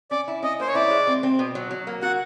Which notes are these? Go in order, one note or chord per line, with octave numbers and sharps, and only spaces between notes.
C#4 D5
E4
C#4 D#5
A#3 C5
C#5
E4 D5
G#3
C4
C4
B2
F#3
F#3
A#3
F#4 F#5